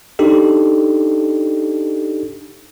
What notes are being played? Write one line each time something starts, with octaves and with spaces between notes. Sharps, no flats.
D4 D#4 G4 A4